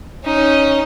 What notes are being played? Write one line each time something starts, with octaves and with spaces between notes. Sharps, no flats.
C#4 D#4